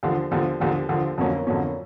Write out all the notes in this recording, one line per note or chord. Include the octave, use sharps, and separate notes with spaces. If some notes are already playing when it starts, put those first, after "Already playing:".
D#2 D3 F3
D#2 D3 F3
D#2 D3 F3
D#2 D3 F3
F2 D3 F#3 A#3 C#4
F2 D3 F#3 A#3 C#4